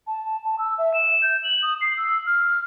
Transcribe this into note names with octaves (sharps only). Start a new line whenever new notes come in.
A5
A5
E6
E5
E7
G6
F#7
D#6
C7
E6
F6